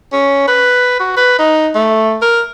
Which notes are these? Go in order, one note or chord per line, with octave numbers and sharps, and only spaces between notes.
C#4
B4
F#4
B4
D#4
A3
A#4